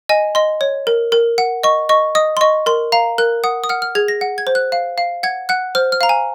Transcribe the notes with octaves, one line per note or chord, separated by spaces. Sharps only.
D#5 G#5
D#5 C6
C#5
A#4
A#4
F#5
D#5 C#6
D#5 C#6
D#5 D#6
C6
D#5 C#6
A#4 C6
F5 A#5
A#4 F#6
F#5 D#6
D#6
F#5 F6
F6
G#4 G#6
A#6
F#5
G#6
C5
F#6
F5
F5
F#5 G#6
F#5 F#6
C5 F6
F6
F5 A#5
G#5